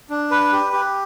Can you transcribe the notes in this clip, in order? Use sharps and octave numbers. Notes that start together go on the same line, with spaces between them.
D4
B4
G4
G4